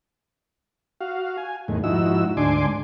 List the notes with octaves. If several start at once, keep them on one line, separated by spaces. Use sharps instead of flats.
F#4 F5
G#5
E2 A2 D#3 G#3
G#2 F3 D#4 E4 F#4 E6
D2 G#2 D4 G#5 C6 D6